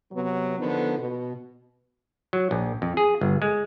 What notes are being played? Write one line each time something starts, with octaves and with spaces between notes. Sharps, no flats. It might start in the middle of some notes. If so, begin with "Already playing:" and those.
C3 F#3 B3
D3 D#3 F3 B3
B2
F#3
A#1
F2
G#4
G1
G#3